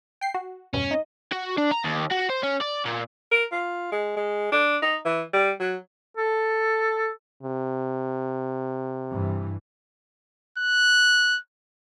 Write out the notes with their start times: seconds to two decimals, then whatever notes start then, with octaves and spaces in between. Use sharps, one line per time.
0.21 G5 C7
0.34 F#4
0.74 E2 G2 B2 C#4
0.91 D#4 D#5
1.32 F#4
1.58 D4
1.71 A#5
1.84 D#2
2.11 F#4
2.29 C5
2.43 C#4
2.61 D5
2.85 A#2
3.31 A#4
3.52 F4
3.92 G#3
4.16 G#3
4.52 D4
4.82 D#4
5.05 E3
5.33 G3
5.60 F#3
6.17 A4
7.43 C3
9.09 G2 E3
10.58 F#6